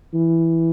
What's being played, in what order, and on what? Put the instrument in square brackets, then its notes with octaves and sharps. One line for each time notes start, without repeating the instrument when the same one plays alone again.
[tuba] E3